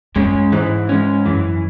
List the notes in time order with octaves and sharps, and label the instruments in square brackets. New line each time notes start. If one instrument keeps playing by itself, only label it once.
[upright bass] F#2 [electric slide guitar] G#3 C#4
[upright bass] G#2 [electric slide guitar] E3
[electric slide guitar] G#3 C#4
[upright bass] F#2 [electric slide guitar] E3